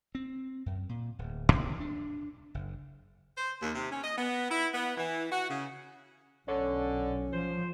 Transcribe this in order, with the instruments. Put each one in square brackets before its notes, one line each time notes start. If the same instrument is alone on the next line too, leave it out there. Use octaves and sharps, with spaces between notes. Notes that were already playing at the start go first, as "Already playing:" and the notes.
[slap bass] C4
F#2
A#2
D1
D#2
D4
F#1
[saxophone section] C5
D#2
C3
C#4
D#5
B3
E4
B3
E3
F#4
C#3
[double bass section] B1 [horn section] D3 [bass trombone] C#4 [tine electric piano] C#5
[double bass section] F3 [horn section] C5